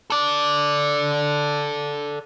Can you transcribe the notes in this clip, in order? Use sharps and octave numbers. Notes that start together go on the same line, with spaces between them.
A4 D5